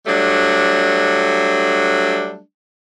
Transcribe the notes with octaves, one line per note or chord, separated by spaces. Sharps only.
F#3 G3 A3 D4